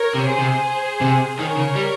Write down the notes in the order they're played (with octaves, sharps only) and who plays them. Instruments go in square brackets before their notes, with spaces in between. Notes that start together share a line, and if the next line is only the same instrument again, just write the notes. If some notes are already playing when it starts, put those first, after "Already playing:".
Already playing: [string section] A#4 C#5
[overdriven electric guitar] C3
[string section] G#4 C5
[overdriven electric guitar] C3
C3
[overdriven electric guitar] D#3 [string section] A#4 C#5
[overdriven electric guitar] C#3
G3